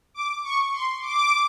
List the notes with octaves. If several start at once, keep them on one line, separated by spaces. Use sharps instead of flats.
D6
C#6
C6
D6